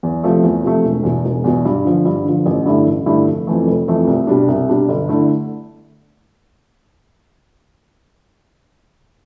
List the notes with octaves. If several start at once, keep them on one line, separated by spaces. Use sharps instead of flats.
E2
C3 F3 A3
E2
C3 F3 A3
E1
E2 B2
E1
E2 B2
G2
D3 F3
G2
D3 F3
A1
G2 D3 A3 E4
A1
G2 D3 A3 E4
F1
F2 E3 A3
F1
F2 E3 A3
C2
B2 G3 D4
C2
B2 G3 D4
G1
D3 A3 E4